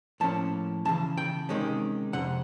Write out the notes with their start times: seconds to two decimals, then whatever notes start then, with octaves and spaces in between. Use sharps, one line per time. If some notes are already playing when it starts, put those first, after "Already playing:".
0.20 A2 F3 A#3 C#4 A5
0.85 C#2 C#3 E3 A5
1.18 G5
1.49 C3 D#3 G#3 C#4
2.13 F2 C3 F#5